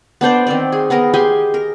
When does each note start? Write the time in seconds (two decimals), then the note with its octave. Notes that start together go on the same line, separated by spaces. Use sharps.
0.21 B3 D4 C5 D5
0.47 D#3 C4 D5
0.72 G#4
0.90 B3 G#4 A#4 A#5
1.14 G4 G#4 G#5 C6
1.54 A#4